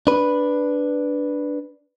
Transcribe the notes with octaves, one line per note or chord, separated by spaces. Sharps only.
D4 B4